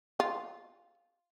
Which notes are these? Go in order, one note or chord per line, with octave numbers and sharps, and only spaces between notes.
F4